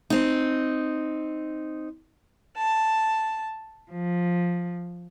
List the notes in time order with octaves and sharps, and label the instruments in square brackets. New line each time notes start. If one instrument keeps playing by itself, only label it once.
[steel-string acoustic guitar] C4 D#4
[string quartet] A5
F3